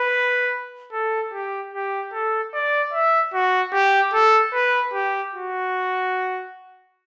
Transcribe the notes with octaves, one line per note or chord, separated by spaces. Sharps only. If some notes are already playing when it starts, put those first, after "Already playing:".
Already playing: B4
A4
G4
G4
A4
D5
E5
F#4
G4
A4
B4
G4
F#4